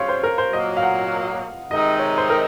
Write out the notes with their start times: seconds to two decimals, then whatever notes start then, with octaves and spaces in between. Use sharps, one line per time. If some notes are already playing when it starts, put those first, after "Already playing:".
Already playing: C#3 F#3 C4 F4 C#5 F5
0.09 C5
0.23 A#4
0.38 C5
0.52 A#2 F#3 A#3 D#5
0.77 F5
0.83 F#5
1.71 C3 D#3 G#3 D#4 D#5
1.99 C#5
2.18 C5
2.30 A#4